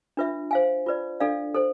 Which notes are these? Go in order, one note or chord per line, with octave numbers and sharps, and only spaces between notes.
D4 F4 B4 E5
C5 F5 G#5
F4 B4 D5
D4 A4 D5 F5
A4 C5